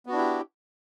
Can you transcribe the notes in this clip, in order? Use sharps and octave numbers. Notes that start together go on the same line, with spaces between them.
B3 D4 E4 F#4 G4